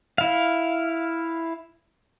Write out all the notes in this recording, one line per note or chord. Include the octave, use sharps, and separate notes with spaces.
E4 F5